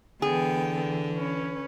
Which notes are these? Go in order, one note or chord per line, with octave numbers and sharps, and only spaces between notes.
D3 E3 B3 G#4 G5
C#4 B4 C#5